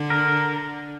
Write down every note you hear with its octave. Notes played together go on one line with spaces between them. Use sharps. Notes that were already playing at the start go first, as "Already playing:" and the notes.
Already playing: D3
A#4